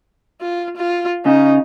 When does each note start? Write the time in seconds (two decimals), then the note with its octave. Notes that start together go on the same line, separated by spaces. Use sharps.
0.41 F4
0.77 F4
1.26 C#3 D#4